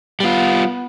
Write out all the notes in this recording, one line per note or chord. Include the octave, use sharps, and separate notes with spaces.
G3 B3 F4